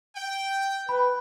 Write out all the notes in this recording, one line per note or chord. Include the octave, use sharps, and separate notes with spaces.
G5
B4 B5